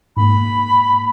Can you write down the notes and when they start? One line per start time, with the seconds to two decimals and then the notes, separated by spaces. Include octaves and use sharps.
0.17 G#2 A#3 B5